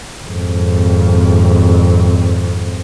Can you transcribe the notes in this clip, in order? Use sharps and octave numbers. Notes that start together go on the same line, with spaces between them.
G#1 F2